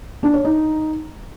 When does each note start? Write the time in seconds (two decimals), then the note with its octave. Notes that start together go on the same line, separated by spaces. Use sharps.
0.23 D4
0.34 C#5
0.45 D#4